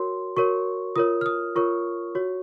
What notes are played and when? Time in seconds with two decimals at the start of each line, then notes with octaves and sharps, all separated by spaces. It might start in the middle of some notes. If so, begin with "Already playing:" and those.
Already playing: F#4 A#4 C#5 C6
0.37 F#4 A#4 C#5 C#6
0.96 F4 A#4 C#5 D#6
1.21 F6
1.26 D#6
1.56 F4 A#4 C#5 C#6
2.15 F#4 C#5